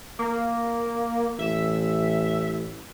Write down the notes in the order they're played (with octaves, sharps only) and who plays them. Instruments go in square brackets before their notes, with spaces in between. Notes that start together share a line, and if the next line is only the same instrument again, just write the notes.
[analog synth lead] A#3
[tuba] A1 [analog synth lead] E5